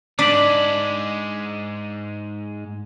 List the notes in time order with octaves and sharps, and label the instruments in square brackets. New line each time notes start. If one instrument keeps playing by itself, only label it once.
[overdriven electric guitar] G#2 G#3 [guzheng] D4 [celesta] D6 B6 F#7